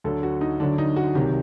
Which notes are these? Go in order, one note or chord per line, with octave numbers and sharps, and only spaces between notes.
D2 D3 F#3 A4
F#4
D#4
D2 D3 F#3 D4
D#4
F#4
C2 C3 D#3 F#3 G4